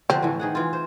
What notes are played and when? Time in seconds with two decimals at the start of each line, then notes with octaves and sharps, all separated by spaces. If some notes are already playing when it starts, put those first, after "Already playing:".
0.10 D3 F3 C4
0.23 A2 E3
0.40 D#3 G#4 F#5
0.55 E3 F4
0.73 C5